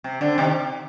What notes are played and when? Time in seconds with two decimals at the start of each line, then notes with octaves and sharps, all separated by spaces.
0.04 C3
0.21 D3
0.38 C3 D#3